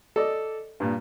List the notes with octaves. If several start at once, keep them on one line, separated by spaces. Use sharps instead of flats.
A4 D5 D#5
G2 A#2